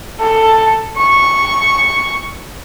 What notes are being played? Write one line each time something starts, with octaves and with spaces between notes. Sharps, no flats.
A4
C#6